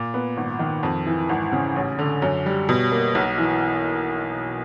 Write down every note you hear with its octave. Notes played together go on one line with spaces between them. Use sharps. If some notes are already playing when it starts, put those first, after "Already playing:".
Already playing: A#2
B3
G#1
D#3
F2
E3
G#1
C#3
A1
D3
F#2
G3
B2
A#3
B1
E3